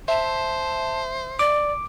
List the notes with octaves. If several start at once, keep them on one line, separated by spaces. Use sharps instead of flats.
C5 E5 A5
D5 D6